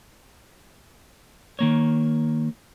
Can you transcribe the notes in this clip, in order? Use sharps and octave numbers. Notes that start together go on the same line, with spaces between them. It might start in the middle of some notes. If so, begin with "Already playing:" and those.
D#3 A#3 C#5